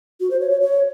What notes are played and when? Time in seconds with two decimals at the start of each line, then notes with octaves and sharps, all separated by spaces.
0.20 F#4
0.30 C5
0.40 C#5
0.51 C#5
0.61 C#5